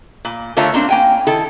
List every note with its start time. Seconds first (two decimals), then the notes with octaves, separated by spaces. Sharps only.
0.25 A#2
0.57 D3 A3 F4 A#4 C#5 E5
0.74 A#3 C4 D4
0.89 A#3 G5 G#5
1.27 D#3 E4 A4